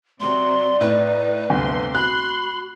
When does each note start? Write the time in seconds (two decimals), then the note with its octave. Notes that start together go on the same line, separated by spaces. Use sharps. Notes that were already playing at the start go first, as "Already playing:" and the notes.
0.20 C3 F#3 D5 C6
0.81 A2 D#4 B4
1.50 G1 D2 C3 C6
1.95 F#4 B5 C6 F#6